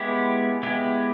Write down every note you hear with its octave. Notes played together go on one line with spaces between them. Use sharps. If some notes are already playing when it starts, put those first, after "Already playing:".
Already playing: G#3 B3 E4 G4
G#3 B3 E4 G4